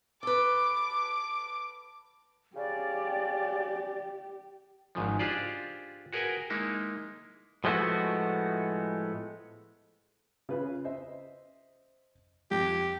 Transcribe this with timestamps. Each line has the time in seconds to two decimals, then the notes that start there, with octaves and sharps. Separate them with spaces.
0.23 A4 B4 D6
2.56 C#3 G4 D5
4.95 G#1 G#2 C#3 F3
5.19 D4 F4 G4 G#4 C5 D5
6.13 F#4 G#4 A#4 B4 G5 G#5
6.50 G#3 A#3 D#4 E4
7.64 A2 F3 G#3 A3 B3 F#4
10.49 C#3 F4 B4
10.85 C5 D#5 E5
12.51 F2 G4